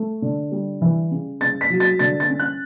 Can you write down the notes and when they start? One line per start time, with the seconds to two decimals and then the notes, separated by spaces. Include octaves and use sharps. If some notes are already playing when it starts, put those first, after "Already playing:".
Already playing: A3
0.22 D3
0.52 G3
0.81 E3
1.11 C#3
1.41 C#3 A6
1.61 B6
1.70 F#3
1.80 A6
1.99 D3 A6
2.20 A6
2.29 C#4
2.39 F#6